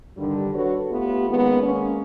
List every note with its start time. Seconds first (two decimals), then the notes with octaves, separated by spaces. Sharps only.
0.17 G2 D3 D#3 G3
0.55 D4 F#4 A4 B4 C#5
0.89 A3 B3 F4 G4
1.29 D#3 G#3 A#3 B3 C#4
1.63 G#3 A#3 C#4